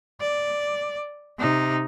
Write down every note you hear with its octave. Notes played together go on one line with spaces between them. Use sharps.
D5
C3 D#4